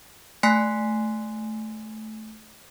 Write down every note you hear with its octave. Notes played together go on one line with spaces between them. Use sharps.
A3 G#5 C6 F#6 B6 C7